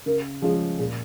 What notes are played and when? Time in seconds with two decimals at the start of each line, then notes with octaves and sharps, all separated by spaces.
0.06 C#3 A#4
0.42 F3 G#3 C#4 F4 G#4
0.79 A#2 G#4